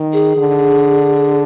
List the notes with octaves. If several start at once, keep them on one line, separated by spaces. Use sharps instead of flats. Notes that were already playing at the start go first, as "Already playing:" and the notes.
Already playing: D#3
G#4
D3